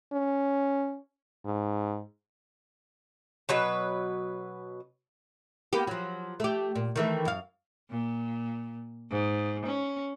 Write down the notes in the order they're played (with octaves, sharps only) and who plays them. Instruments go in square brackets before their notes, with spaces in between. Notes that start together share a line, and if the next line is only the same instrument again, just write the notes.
[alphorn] C#4
G#2
[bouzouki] B2 F#3 B4
[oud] A#3 B3 G4
F3 F#3
A3 G4
A#2
D#3 E3 A3
F#2 F5
[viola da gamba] A#2
G#2
C#4